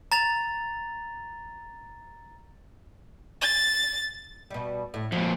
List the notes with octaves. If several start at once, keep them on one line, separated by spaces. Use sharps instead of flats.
A#5 A6 F7
A6
B2 G3
A2
F2 A#2 F#4